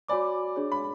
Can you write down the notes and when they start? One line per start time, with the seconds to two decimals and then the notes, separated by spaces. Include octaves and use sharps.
0.08 F#4 C#5 D5 G#5 B5 D6
0.56 D4 G#4 C#5
0.72 B5